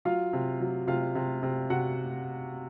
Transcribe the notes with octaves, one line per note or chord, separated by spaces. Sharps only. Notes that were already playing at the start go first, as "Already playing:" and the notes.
F#3 F4 F5
C3
F#3
C3 F4 F5
C3
C3
C3 F#4 F#5